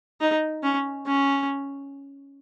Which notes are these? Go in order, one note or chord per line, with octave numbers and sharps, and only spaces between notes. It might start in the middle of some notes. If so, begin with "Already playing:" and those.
D#4
C#4
C#4